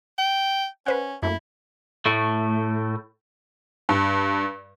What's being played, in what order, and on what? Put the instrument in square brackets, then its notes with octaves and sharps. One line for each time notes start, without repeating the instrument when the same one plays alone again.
[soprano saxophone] G5
[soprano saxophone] C#4 [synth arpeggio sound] B4 C5 F#5
[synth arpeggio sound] F#2 A3 A#3 [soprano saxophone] E4
[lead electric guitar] A2 A3
[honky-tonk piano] G2